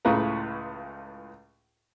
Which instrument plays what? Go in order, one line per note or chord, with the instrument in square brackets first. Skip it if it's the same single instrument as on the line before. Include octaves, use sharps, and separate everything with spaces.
[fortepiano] C#2 A2 C#3 F4 B4 A#5